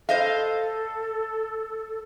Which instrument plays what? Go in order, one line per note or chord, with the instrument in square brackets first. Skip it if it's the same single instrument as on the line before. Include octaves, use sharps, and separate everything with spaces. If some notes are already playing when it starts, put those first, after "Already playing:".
[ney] A4 [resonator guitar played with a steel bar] C5 D#5 F5